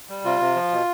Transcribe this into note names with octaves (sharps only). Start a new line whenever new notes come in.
G3
C3 F4
C3
F3
B2